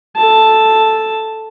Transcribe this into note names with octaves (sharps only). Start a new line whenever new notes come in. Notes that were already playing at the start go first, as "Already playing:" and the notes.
A4 A5